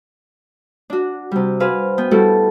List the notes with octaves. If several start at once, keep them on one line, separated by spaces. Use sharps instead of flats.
D4 F#4
C3 G3
F#4 G#4 B4 C5 F5
B3 G5
G3 A3 E4 F#4 A4